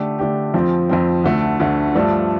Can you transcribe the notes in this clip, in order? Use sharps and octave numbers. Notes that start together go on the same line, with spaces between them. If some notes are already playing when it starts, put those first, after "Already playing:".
Already playing: D3 A3 D4 G4
D3 A3 D4 G4
F2 F3 C4
F2 F3 C4
D2 D3 A3
D2 D3 A3
G2 F3 A3 D4